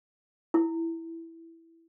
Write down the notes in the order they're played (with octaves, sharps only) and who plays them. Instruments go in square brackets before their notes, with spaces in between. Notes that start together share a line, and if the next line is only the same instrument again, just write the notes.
[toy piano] E4